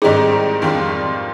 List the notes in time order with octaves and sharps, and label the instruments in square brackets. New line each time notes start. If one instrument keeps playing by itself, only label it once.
[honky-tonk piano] G#2 D#3 G3 C4 D#4 [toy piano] G#4
[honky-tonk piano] F2 D#3 G3 D4 F4